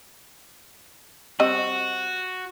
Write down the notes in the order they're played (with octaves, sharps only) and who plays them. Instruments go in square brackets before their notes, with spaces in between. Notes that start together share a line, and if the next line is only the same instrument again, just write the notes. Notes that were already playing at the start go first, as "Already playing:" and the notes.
[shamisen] G3 C4 D#5 [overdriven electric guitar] F#4